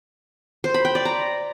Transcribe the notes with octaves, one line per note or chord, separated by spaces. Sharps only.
C5
B5
G5
D5
A#5